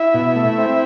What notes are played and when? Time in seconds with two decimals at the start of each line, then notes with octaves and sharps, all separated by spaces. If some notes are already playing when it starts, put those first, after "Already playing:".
Already playing: E4 E5
0.14 B2
0.36 A3
0.58 C4